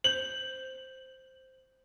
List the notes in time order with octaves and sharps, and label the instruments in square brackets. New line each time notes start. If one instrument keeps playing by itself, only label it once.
[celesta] C5 G6 [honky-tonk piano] F#7